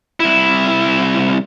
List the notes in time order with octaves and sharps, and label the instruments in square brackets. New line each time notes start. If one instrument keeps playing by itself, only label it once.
[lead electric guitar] C2 E4